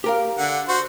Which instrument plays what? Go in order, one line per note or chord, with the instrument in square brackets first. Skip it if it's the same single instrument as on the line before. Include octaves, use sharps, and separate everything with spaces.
[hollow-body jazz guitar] G4 A#4 F5
[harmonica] D3 F#5
F#4 C5